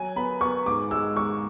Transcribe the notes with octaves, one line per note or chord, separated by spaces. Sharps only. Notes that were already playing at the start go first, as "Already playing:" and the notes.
Already playing: F#3 G#5
B3 B5
B3 C#6
G#2 D6
G#3 E6
G#3 C#6